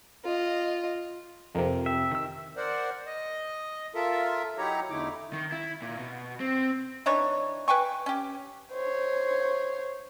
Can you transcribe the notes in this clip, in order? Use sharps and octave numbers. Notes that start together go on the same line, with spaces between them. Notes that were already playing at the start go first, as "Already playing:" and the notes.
F4 D#5
F2 C3 A#4
E5 G5
D#3 E6
A#4 C5 D5 F#5
D#5
F4 A4 A#4 E5
F#3 D#4 E4 G4 C#5 A#5
E2 D3 A3 D#4 E4 D6
D#3
E4
A#2
B2
C4
E3 D4 D#4 C#5
B4 G5 G#5 C#6
C#4 G4
C5 C#5